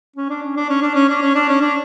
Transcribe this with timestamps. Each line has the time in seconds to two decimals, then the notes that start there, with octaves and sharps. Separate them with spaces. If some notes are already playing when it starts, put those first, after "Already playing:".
0.16 C#4
0.29 D4
0.43 C#4
0.56 D4
0.69 C#4
0.82 D4
0.95 C#4
1.09 D4
1.22 C#4
1.35 D4
1.48 C#4
1.61 D4